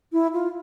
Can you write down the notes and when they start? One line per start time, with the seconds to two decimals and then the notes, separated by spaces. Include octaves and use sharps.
0.12 E4
0.33 F4